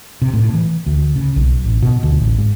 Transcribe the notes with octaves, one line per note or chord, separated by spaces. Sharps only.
C3
A2
E3
D2
C#3
B1
A1
B2
D2
A1
G#2